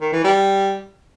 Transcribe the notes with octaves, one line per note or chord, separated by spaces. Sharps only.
D#3
E3
G3